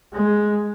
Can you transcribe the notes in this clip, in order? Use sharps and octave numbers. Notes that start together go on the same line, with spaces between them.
G#3